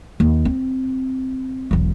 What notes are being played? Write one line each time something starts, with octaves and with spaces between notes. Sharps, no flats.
D#2
C4
E1 B1